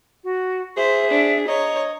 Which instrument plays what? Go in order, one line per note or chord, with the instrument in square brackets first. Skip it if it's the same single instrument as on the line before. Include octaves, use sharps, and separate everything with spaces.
[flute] F#4
[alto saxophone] G#4 [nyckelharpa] C5 [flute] E5
[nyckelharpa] D4
[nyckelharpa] C#5 [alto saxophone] D#5 [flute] A#5